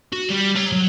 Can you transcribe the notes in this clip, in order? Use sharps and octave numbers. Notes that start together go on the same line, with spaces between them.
F#4
G3
C#5 A#5
F#3